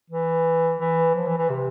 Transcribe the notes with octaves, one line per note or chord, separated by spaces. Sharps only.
E3
E3
F3
E3
E3
C3